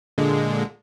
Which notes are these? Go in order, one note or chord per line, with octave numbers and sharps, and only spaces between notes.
A#2 D3 G#3